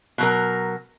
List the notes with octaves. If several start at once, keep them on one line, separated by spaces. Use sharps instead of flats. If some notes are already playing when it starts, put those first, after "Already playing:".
B2 F#3 A#4